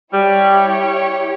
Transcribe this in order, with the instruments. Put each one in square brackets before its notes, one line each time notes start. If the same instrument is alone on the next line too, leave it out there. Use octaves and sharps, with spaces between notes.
[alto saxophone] G3 [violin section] E4 G4 C#5